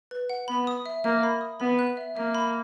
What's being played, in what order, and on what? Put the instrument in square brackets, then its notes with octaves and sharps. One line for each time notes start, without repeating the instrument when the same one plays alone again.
[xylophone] B4
F#5
[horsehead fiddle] B3 [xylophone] B5
[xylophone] D#6
E5
[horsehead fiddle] A#3 [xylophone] E5
[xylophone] B5
D#6
[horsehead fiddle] B3 [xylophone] B5
[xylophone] F#6
E5
[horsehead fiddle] A#3 [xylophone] E5
[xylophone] B5